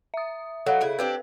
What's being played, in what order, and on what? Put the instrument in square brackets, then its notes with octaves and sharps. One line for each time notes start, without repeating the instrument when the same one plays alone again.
[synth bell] E5 D#6
[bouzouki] F#3 [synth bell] A4 F5
[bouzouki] C#3 E4
[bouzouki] C4 D4 G4 [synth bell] B4